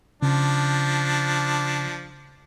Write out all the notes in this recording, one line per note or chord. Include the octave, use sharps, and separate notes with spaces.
C#3 F3 D4